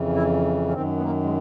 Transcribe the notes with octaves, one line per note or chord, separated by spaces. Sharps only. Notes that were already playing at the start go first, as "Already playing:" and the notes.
Already playing: F2 C#3 E3
E4
C#4
F#2 D#3 C4
B3
A#3
G#3